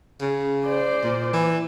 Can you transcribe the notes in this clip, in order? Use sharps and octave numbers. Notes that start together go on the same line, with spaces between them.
C#3
C5 D5
A#2
E3